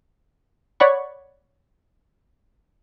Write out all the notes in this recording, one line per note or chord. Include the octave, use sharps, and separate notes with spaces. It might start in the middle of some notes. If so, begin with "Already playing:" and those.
C#5 D5 F#5 B5 C#6